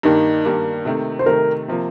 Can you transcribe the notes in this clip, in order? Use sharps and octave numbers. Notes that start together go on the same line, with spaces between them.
G2 D#3 G3 A#3 D#4
G2 D#3 G3 A#3
C3 D#3 A3
C5
C3 D#3 A3 A#4
C3 F3 A#3